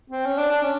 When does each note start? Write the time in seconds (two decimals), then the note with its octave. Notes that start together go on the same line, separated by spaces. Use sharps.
0.10 C4
0.26 C#4
0.38 D4
0.50 D4
0.63 C#4